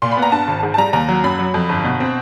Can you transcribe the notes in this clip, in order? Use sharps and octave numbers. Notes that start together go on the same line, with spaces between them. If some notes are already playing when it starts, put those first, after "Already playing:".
A#2 C6
B5
B3
A#5
G2 A5
G#1
G#2
A5
G3 A#5
D#2 A#5
F#3
F#2 B5
F#3
F2
G1
B2
C4